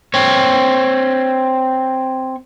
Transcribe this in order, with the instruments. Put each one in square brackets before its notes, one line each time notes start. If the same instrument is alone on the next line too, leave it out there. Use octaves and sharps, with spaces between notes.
[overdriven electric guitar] C4 C#5